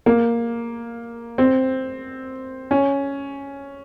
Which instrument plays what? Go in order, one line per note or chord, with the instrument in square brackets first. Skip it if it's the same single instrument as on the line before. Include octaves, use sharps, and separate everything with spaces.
[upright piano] A#3
C4
C#4